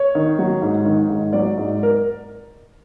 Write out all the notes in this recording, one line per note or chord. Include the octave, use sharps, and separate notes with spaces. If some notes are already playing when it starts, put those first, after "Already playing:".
Already playing: C#5
D#3
F#3
G#2
D#3
G#2
F#3 D5
G#2
A#4